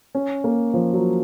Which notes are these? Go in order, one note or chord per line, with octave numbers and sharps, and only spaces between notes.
C#4
A#3
F3
F#3